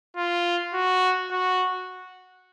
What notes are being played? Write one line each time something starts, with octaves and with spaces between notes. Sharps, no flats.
F4
F#4
F#4